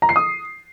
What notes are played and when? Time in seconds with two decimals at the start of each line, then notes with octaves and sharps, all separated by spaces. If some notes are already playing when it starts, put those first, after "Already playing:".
0.02 A#5
0.09 C7
0.16 D#6